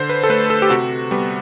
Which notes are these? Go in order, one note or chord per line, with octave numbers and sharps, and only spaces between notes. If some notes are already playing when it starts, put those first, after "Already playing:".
Already playing: D3 C5
B4
A4
A3 B4
A4
G4
C3 F#4
G3 B3